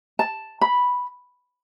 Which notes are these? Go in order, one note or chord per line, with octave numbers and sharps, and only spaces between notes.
A5
B5